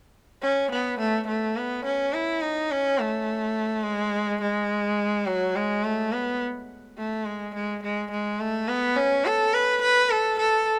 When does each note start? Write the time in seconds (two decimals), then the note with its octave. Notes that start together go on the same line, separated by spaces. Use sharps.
0.42 C#4
0.71 B3
1.00 A3
1.28 A3
1.57 B3
1.85 C#4
2.14 E4
2.42 D#4
2.71 C#4
2.99 A3
3.85 G#3
4.42 G#3
5.27 F#3
5.55 G#3
5.84 A3
6.13 B3
6.98 A3
7.26 G#3
7.55 G#3
7.83 G#3
8.11 G#3
8.40 A3
8.68 B3
8.96 C#4
9.26 A4
9.54 B4
9.82 B4
10.11 A4
10.40 A4